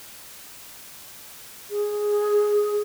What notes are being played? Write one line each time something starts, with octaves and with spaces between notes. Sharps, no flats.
G#4